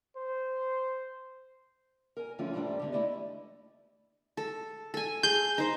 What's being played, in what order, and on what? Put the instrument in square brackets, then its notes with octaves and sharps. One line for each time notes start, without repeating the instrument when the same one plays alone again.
[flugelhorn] C5
[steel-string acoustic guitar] A#4 G#5
D3 E3 F3 A3 C#4 F4
G#2 F#3 G3 A3 D4 G5
E2 D3 G4
A3 E4 D5 D#5
[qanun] A4
A4 G#5
[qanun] G#4 [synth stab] G6
[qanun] D#4 C5